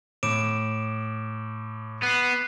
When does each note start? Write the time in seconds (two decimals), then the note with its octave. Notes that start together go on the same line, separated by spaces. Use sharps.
0.23 A2 D6 D7 E7
2.03 B3 F#6 C7